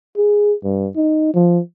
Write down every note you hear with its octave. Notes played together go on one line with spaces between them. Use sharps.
G#4
G2
D#4
F3